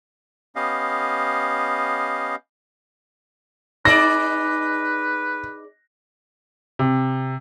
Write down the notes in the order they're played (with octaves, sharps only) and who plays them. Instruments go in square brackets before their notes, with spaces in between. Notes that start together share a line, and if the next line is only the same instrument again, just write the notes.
[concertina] B3 C#4 G4 D#5 F5
[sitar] D#4 G#4 D5 [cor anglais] B4 [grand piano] A#6
[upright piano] C3